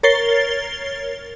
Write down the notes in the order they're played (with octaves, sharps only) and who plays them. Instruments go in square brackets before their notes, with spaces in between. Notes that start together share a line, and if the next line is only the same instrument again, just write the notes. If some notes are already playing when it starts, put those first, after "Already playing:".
[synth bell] A#4 C#5 A6 C7 G7